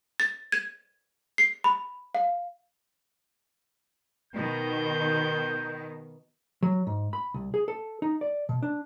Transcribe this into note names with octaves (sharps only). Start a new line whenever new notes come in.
A6
G#6
C7
B5
F5
B2 D#3 G6
F#3
G#2
B5
C2
G#4
A4
D#4
D5
B2
D4